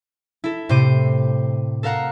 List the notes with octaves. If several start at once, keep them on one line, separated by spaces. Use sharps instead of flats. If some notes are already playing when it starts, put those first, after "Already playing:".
E4 A4
A2 C3 C5 D6 D#7
A4 A#4 F5 F#5 A#5